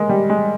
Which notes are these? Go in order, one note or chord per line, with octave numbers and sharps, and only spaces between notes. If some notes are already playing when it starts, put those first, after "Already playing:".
Already playing: G#3 A#3
G3
G#3